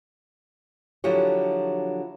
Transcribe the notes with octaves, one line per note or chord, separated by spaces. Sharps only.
D3 F3 F#3 E4 G4 C#5